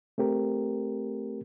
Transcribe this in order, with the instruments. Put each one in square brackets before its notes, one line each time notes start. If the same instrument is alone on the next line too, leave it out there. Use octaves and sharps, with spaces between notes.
[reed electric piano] A3 C4 G4 A#4